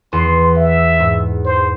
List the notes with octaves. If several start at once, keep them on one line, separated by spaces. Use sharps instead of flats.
E2 C6
E5
G#2
C5